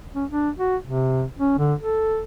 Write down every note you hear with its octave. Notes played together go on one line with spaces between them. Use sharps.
C#4
D4
F#4
C3
C#4
D3
A4